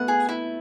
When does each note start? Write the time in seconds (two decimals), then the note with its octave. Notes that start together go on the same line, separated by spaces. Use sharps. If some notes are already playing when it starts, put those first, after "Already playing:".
Already playing: A3 B3 F#5
0.08 G#4
0.29 E4